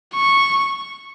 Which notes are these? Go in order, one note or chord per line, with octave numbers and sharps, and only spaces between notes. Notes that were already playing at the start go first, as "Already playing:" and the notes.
C#6